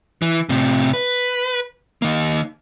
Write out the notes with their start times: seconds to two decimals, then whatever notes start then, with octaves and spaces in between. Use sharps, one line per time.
0.22 E3
0.49 A2 C3
0.94 B4
2.02 D#3 A#3